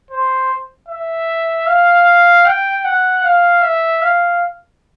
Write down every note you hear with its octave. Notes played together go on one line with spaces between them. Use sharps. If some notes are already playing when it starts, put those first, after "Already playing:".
C5
E5
F5
G5
F#5
F5
E5
F5